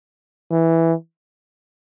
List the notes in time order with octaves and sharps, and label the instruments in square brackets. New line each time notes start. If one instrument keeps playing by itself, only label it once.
[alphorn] E3